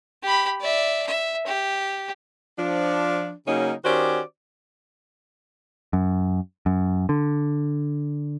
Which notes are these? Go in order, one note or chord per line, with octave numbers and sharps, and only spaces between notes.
G4 B5
D5 E5
E5
G4
F3 D4
C#3 F#3 A#3 C#4 D#4
D#3 C#4 F#4 G4 C5 D5
F#2
F#2
D3